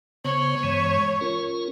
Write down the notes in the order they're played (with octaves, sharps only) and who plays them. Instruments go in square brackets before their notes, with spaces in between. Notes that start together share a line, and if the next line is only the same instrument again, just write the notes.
[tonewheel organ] C#3 B3 C5 [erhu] C#5
[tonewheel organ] G2 E3 G#3
C#4 F4 A#4